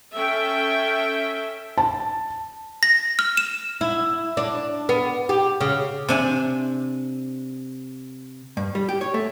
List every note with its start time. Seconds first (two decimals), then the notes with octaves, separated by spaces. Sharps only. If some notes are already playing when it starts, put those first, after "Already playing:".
0.14 C#4 A4 E5 G5
1.78 A5
2.83 A#6
3.19 F6
3.37 E7
3.81 E4
4.37 D4
4.89 B3
5.29 G4
5.61 C#3
6.09 C3 D4 G#5
8.57 G2
8.75 G3
8.89 G4
9.01 C#5
9.14 A3